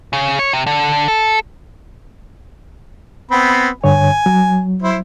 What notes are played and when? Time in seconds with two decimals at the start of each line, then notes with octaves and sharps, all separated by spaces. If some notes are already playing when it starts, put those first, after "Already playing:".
0.13 C#3
0.39 C#5
0.53 C3
0.67 D3
1.08 A4
3.31 B3 C4 B5
3.84 G2 D3 C#5 G#5
4.26 F#3
4.82 E4 C5